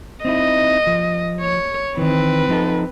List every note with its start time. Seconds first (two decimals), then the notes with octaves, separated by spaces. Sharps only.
0.25 C4 D#4 E4 D#5
0.87 F3
1.41 C#5
1.97 D#3 E3 C4 B4
2.49 F3 D#4 A4